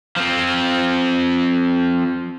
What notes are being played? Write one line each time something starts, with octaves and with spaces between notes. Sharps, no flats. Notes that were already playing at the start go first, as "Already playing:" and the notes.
F3 C4